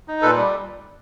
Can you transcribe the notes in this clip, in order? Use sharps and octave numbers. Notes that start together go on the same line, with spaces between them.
D#4
A#2 A4 B4
G3